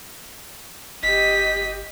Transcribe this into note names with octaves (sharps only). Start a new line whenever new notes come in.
G1 G4 D#5 B6